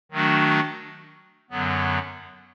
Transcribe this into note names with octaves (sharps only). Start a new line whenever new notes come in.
D#3 F#3 A3 D4 F#4
F#2 D3 F#3 B3